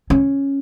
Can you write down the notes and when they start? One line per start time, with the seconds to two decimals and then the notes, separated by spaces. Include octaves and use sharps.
0.10 C#4